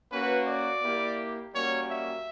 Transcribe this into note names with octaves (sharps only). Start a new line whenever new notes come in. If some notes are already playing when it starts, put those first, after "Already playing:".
A#3 C#4 F#4 B4
D5
A#3 E4 G4
G3 A#3 C#4 F#4 C#5
E5